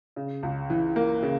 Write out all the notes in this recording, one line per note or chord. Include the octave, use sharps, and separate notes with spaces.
C#3
C#2
E3
A#3
C#3